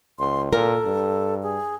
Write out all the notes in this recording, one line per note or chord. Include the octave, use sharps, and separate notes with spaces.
C#2 C6
A#2 A4 A#4
G2
G#4